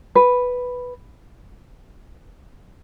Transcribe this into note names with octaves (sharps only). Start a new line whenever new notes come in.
B4